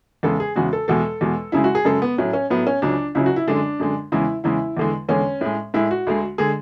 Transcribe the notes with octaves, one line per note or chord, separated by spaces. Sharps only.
E2 C#3 G#3 A4
G#4
E2 C#3 G#3 F#4
A4
E2 B2 G#3 A4
E2 B2 G#3
F#2 C#3 G#3 E4
F#4
G#4
F#2 C#3 G#3 A4
B3
A2 F#3 C#4
C#4
A2 F#3 B3
C#4
C#2 C#3 F#3 D4
C#2 C#3 F#3 E4
F#4
E4
F#2 D3 G#3 D4
F#2 D3 G#3
E2 C#3 G#3 E4
E2 C#3 G#3 E4
E2 D3 G#3
E2 D3 G#3 C#4
A2 G#3
A2 G#3 E4
F#4
D2 D3 G#3
D3 G#3 G#4